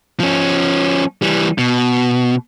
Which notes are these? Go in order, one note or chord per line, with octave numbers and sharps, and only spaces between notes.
F3 C#4
E3 G3
B2